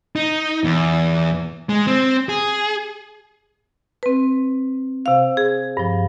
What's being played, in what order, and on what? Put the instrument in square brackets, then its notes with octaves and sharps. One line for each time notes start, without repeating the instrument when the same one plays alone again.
[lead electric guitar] D#4
E2
G#3
C4
G#4
[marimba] C4 B4
C3 F5
G#4
G2 F3